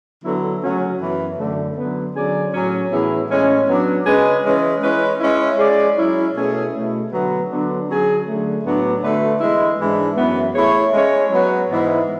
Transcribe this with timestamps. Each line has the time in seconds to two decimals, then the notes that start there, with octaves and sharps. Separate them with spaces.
0.23 D3 F#3 B3 E4 A4
0.61 C#3 F#3 A3 C#4 F#4
0.99 F#2 E3 B3
1.37 F#2 D3 A3
1.75 D3 F#3 B3
2.14 D3 F#3 C#4 G#4 D5
2.52 A2 F#3 C#4
2.90 A2 E3 B3 E4 G#4
3.28 A2 G#3 C#4
3.67 F#3 B3 D4
4.05 C#3 G#3 C#4 G#4 B4
4.43 E3 G#3 C#4
4.81 G#3 C#4 E4 B4
5.19 G#3 C#4 E4
5.58 G#3 C#4 G#4 D5
5.96 F#3 C#4 E4
6.34 B2 A3 C#4 G#4
6.72 B2 A3 E4
7.10 D3 F#3 B3
7.49 D3 F#3 B3 D4
7.87 D3 F#3 C#4 G#4
8.25 D3 F#3 A3
8.63 A2 F#3 B3 D4
9.01 D3 A3 D4 F#4 B4
9.40 E3 G#3 B3 E4
9.78 G#2 E3 G#3 D4
10.16 F#2 E3 B3
10.54 A3 E4 G#4 C#5
10.92 G#3 C#4 G#4 C#5
11.31 F#3 B3 F#4
11.69 G#2 E3 B3 E4